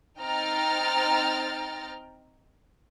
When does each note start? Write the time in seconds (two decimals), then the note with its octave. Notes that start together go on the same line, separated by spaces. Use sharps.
0.20 C4 D#4 G5 A#5 F6 A6